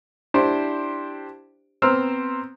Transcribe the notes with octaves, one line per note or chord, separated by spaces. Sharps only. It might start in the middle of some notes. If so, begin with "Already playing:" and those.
D4 E4 G4 C5
B3 C4 C5 A#5 E6 F6